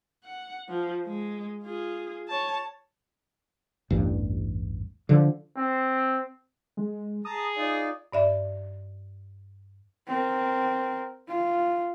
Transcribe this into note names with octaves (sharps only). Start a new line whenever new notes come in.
F#5
F3
G#3
F4 G#4
C#5 A5
A1 E2 G2
D3 F3
C4
G#3
G#4 A5 A#5 D#6
D#4 F4 D5
G2 D5 E5
C4 A#4
F4